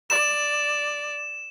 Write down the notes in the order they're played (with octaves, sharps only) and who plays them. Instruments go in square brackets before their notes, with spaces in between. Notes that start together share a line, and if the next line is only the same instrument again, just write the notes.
[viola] D5 [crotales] E7